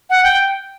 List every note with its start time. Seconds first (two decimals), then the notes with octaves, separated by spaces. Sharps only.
0.10 F#5
0.24 G5